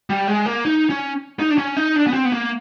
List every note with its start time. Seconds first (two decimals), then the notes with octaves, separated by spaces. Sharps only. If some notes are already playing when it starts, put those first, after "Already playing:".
0.10 G3
0.28 G#3
0.46 A#3
0.65 D#4
0.90 C#4
1.40 D#4
1.50 D4
1.58 C#4
1.77 D#4
1.96 D4
2.07 B3
2.13 C4
2.25 B3
2.32 A#3